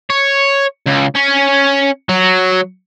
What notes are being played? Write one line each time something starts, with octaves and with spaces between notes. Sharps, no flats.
C#5
C#2
C#4
F#3